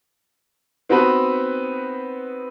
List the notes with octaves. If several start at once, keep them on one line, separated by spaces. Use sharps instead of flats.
B3 C4 D#4 F#4 B4